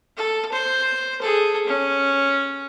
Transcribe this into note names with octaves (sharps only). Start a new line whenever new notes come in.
A4
C5
G#4 A4
C#4